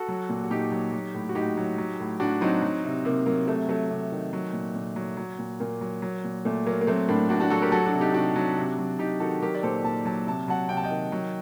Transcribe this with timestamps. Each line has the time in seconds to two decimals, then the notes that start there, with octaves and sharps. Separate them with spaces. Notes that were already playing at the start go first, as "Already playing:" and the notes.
Already playing: F#4 A4
0.08 F#3
0.29 A#2
0.44 F#4
0.50 A#2 D#4 G4
0.72 F#3
0.93 F#3
1.14 A2
1.29 F#4
1.35 A2 D#4 G4
1.57 F#3
1.78 F#3
2.00 A2
2.20 A2 D4 F#4
2.41 F#3 C4 D#4
2.62 F#3
2.85 C3
3.05 C3 A#3
3.26 F#3 A#3
3.48 C3 A3
3.69 F#3 A3
3.90 C3
4.12 D#3
4.33 F#3
4.53 A#2
4.75 A#2
4.96 F#3
5.17 F#3
5.39 A#2
5.60 A#2 A#3
5.81 F#3
6.02 F#3
6.24 A#2
6.45 A#2 A3
6.66 F#3 A#3
6.81 A#3
6.87 F#3 A3 C4
7.08 A2 A#3 D4
7.29 A2 D4 F#4
7.40 D4 F#4
7.50 F#3 F#4 A4
7.62 G4 A#4
7.72 F#3 F#4 A4
7.86 D4 F#4
7.93 C3
8.01 D#4 G4
8.14 C3 D4 F#4
8.36 F#3
8.58 C3
8.78 F#3
8.99 C3 D#4 G4
9.20 D#3 F#4 A4
9.42 F#3 G4 A#4
9.55 D5
9.63 A#2 A4 C5
9.84 A#2 A5
10.05 F#3 A5
10.27 C3 A5
10.48 F#3 F#5 A5
10.69 C3 G5
10.77 A5
10.83 D#5 G5
10.91 D#3
11.12 F#3